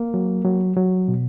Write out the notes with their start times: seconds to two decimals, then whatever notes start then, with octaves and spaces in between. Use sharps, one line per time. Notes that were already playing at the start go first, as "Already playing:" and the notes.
Already playing: A#3
0.14 F#3
0.45 F#3
0.76 F#3
1.08 B2